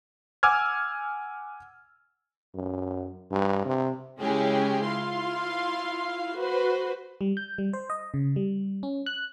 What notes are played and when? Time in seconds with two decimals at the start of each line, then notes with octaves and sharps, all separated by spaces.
0.43 F#5 G#5 D6 E6 F6 G#6
2.55 F#2
3.31 G2
3.66 C3
4.20 C#3 G#3 C#4 E4 G4 G#4
4.86 E4 F4 F5 C6
6.37 F#4 B4 C5
7.21 G3
7.37 G6
7.58 G3
7.73 C5
7.90 D#5
8.14 C#3
8.36 G3
8.83 C#4
9.06 F#6